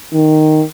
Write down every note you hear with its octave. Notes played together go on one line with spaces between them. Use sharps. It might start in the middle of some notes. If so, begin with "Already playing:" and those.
D#3